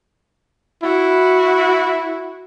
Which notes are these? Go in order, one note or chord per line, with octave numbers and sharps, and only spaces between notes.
E4 F#4